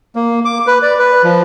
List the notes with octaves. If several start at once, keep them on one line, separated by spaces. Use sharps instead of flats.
A#3
D6
B4
D5
B4
F3